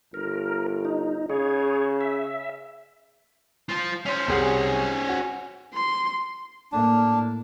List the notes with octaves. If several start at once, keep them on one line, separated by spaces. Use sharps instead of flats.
G1 A#4
D#4
C#3 G#4 C#5
E5
F4 C5
C#4 C5
C2 G#4 F#5
F#4
C6
A2 A#3 D4